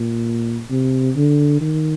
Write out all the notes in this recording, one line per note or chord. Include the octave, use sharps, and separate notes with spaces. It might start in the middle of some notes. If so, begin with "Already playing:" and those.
Already playing: A#2
C3
D3
D#3